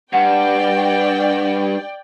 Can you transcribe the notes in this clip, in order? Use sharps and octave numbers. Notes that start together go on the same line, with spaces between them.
G2 D5 F#5 G5